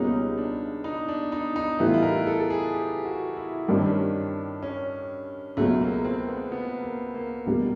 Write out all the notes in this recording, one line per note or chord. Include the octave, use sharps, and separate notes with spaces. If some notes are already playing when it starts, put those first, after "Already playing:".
Already playing: C#2 B2 G3 A#3 C#4 D#4
D4
D#4
D4
D#4
D#4
A2 E3 G3 B3 D#4 E4
F4
E4
A#4
A4
A4
G#4
G4
F#4
E4
G2 D#3 G3 C4 D4
C#4
D4
C#4
C#2 B2 F#3 A3
A#3
C4
B3
B3
A#3
A#3
C#2 B2 G3 A#3